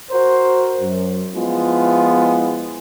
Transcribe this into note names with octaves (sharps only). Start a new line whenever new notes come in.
F#4 A#4 C5
F#2
F3 G#3 B3 E4 F4